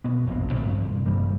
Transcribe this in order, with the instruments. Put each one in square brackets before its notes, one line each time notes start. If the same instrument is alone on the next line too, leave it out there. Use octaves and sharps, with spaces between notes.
[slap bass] B2 B3
F1 A#1 F#2 C3
D2 A2 A#3 C4
G2 C3
G#1 G2 G3 A#3